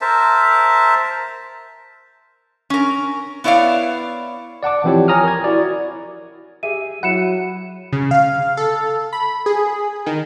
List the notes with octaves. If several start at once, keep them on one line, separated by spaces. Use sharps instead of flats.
A#4 C5 E5 A5
C#4 A#4
B3 E4 C#5 D5 F5
D5 F#5 A5 D6
E3 F3 C4 E4 G4 C#5
C#5 G#5 A#5 D#6 F6
A#4 G#6
E4 F#4 D5
G4 G#4 E5 D#7
F#3 E4 F#5 B5 C#7 E7
C#3
F5
A4
B5
G#4
D#3